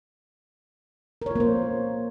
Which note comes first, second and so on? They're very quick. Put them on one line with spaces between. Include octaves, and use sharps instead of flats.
A#4 C#5 F4 A#3 C5